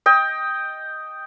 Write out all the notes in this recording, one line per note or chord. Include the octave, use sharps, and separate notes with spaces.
D#5 G5